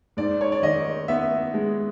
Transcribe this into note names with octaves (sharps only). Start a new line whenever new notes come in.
G#2 D5
C#5
D5
D#3 D#5
B3 E5
G#3